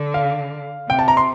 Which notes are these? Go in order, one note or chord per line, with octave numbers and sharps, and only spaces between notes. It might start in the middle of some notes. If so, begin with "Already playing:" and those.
Already playing: D3
F5
C3 G5
A5
A#5
C6